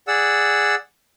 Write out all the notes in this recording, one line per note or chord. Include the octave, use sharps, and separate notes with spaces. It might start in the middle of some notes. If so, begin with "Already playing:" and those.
G#4 D5 F#5 E6